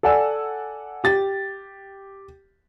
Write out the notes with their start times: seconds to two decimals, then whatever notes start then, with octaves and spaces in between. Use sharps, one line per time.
0.03 A4 D5 F#5 G#5 E6
1.04 G4 A6